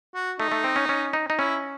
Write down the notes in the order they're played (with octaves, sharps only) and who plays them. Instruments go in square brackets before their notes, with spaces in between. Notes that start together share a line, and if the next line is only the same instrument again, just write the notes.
[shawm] F#4
[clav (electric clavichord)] A3 [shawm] D#4
[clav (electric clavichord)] A3
C4
C#4
C#4
D#4
D#4
[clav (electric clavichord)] C#4 [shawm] E4